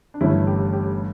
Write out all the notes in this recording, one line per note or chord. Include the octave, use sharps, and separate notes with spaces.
D4
G1 G2 E3 A3 C#4 E4
G4
G4